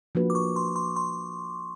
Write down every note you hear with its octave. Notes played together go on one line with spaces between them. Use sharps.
F3 A#3 D4 F#4 B4
D6
C#6
C6
C6
C6